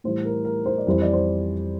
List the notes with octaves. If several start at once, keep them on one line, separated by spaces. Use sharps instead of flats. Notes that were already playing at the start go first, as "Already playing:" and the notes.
A2 E3 G3 C5
A#4
A#4
C5
D5
F2 E3 G3 C5
D5
C5